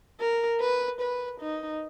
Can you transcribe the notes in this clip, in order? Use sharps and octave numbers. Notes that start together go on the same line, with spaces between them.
A#4
B4
B4
D#4